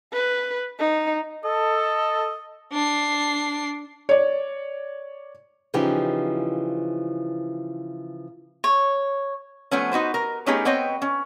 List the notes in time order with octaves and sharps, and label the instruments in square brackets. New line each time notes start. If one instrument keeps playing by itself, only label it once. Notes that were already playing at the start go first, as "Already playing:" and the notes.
[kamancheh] B4
D#4
[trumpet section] A4 [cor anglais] D#5
[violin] D4 C7
[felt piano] C#5 D5
[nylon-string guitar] C#3 E3 F3 D#4 G4
[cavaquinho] C#5
[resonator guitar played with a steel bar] F3 A3 B3 C#4
D#4 F#4 B4 C5
A#4
A3 B3 C#4 D#4 G4 G#4
B3 C4 C#5 D#5 G5
C#4